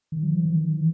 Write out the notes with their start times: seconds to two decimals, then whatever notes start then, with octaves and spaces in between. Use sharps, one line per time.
0.12 D#3
0.23 F#3
0.33 E3
0.45 E3
0.56 D#3
0.77 E3